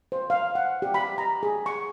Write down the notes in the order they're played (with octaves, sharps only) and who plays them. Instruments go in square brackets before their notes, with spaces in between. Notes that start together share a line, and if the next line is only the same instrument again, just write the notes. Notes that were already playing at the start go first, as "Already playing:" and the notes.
[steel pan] C5
F5
F#5
G4
B5
A#5
G#4
C#6